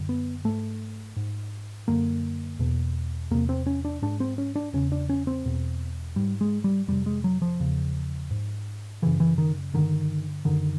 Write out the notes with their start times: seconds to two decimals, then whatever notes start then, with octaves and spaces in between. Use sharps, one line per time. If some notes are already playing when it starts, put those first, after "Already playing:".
Already playing: F#2 D3
0.09 B3
0.44 G#2 A3
1.17 G#2
1.88 F#2 D3 A#3
2.59 E2 B2
3.31 E2 C3 A#3
3.49 C4
3.66 C#4
3.85 D4
4.02 G#2 D4
4.20 C4
4.38 C#4
4.56 D4
4.73 E2 C#3 C#4
4.92 D4
5.10 C#4
5.27 C4
5.45 E2 B2
6.16 G#2 G3
6.41 G#3
6.64 G3
6.88 F2 C3 G3
7.06 G#3
7.24 F#3
7.42 F3
7.60 E2 C#3
8.31 G#2
9.02 F#2 C#3 E3
9.20 E3
9.38 D#3
9.74 G2 D3 D#3
10.45 F#2 D3 D#3